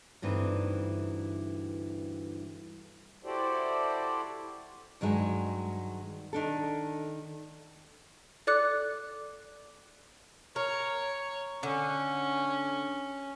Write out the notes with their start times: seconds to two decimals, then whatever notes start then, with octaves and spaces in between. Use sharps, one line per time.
0.22 D2 G2 E3 C4 D#4
3.24 E4 F#4 G4 A4 C5 D5
5.01 G2 D#3 F#3 G#3
6.33 D#3 D4 A4
8.47 A4 D5 D6 F#6 C#7
10.56 A#4 C#5
11.63 D3 C#4